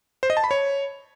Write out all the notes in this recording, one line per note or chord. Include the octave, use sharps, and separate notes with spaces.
C5
D#5
A5
B5
C#5